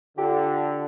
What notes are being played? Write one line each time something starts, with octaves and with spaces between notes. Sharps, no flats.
D3 F4 G4